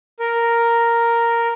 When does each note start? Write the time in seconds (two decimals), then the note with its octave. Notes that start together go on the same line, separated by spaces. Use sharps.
0.19 A#4